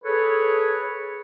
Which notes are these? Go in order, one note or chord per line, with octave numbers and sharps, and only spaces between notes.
G#4 A4 B4 C#5